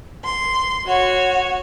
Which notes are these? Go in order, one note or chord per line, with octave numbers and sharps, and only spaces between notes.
C6
F#4 C#5